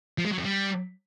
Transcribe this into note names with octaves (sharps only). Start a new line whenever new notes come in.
F3
G#3
F#3
F2
G3